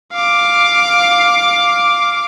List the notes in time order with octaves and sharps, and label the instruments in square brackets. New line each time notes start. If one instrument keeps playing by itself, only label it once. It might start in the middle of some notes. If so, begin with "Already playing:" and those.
[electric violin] F5 D6